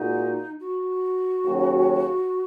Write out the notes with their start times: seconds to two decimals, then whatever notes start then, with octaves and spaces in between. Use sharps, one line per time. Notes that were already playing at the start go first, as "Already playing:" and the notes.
Already playing: A#2 G#3 D#4 F#4
0.60 F#4
1.44 D#2 C#3 F#3 C#4